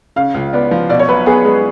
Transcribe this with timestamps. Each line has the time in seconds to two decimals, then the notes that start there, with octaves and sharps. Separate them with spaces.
0.16 C#3 F5
0.34 C#2
0.53 B3 D5
0.71 F3
0.89 B2 D5
0.99 C#5
1.09 B1 B4
1.26 B3 G#4
1.45 G#3